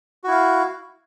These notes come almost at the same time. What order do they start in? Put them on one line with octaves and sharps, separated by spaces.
F#4 E4 F5